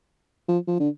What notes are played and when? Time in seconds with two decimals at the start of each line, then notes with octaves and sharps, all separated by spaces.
0.48 F3
0.67 F3
0.79 D3